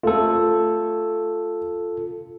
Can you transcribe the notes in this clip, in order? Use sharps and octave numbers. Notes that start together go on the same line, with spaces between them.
A3 F4 A4